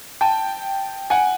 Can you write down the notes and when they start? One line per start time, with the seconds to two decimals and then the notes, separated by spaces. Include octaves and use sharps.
0.21 G5 A5
1.10 F#5 G#5